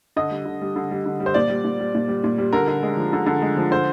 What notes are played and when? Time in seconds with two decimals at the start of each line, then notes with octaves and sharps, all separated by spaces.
0.17 D3 D#5
0.31 G3
0.46 D3
0.61 G3
0.76 D3
0.91 G3
1.06 D3
1.20 G3
1.26 C5
1.34 A#2 D5
1.49 G3
1.64 A#2
1.80 G3
1.95 A#2
2.08 G3
2.24 A#2
2.38 G3
2.53 D3 A#4
2.68 D3
2.83 G#3
2.97 F3
3.13 D3
3.27 D3
3.42 G#3
3.57 F3
3.71 D3 C5